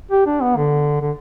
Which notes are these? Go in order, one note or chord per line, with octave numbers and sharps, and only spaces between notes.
G4
D4
B3
D3
D3